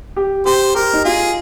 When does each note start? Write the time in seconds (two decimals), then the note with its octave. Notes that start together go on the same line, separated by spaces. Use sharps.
0.16 G4
0.46 G4 C5
0.75 G4 A#4
0.93 D#4
1.05 F4 G#4